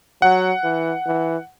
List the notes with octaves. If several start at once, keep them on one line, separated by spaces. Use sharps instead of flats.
F#3 F#5
E3
E3